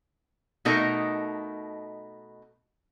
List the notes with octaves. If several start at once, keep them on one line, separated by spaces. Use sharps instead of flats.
B2 A3 D#4 A4 A#4 D#5